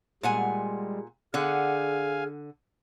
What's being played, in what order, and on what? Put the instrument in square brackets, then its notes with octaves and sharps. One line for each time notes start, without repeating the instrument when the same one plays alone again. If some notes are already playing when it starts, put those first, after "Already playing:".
[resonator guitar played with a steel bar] A#2 F#5 G#5 [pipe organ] G3 G#3
[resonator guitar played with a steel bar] D3 F#5 [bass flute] G#4 [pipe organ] F5 G#5